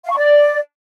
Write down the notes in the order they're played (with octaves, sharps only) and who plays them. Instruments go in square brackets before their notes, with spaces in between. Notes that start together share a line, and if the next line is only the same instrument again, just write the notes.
[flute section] F5
C#6
D5